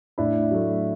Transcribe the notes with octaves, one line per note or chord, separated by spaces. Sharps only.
A2 D4 E4
F#3 A3